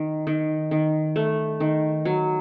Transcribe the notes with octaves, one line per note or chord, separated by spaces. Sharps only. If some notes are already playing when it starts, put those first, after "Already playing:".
Already playing: D#3
D#3
D#3
A3
D#3
F#3